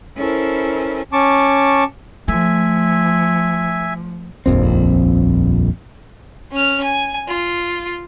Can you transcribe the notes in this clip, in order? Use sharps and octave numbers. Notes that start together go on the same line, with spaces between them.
C#4 E4 A4 A#4 C5
C#4 A5 C#6 D6
F3 A3 E5 G#5
D#1 A#1 F2 C4
C#4 F6
G#5
F4